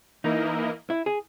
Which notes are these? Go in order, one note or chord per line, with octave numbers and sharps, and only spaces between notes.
E3 A#3 D#4 E4 A#4 D#5
E4
G#4